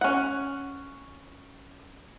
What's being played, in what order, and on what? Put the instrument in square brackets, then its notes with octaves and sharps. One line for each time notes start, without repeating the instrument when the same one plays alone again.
[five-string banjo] C#4 F#5